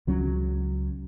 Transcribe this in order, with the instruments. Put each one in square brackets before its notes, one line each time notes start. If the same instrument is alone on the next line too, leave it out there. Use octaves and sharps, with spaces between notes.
[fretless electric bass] C#2 F#3 C#4